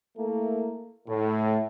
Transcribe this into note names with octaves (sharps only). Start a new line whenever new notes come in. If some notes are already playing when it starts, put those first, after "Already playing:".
A3 A#3 E4 A4 A#4
A2